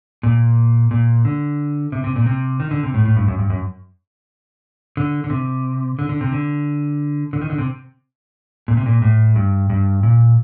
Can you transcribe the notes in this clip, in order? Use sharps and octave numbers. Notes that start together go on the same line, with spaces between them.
A#2
A#2
D3
C3
C3
A#2
C3
D#3
D3
C3
A2
A2
G2
F#2
G2
F#2
D3
D3
C3
D3
D3
C3
D3
D3
D#3
D3
C3
A#2
C3
A#2
A2
G2
G2
A#2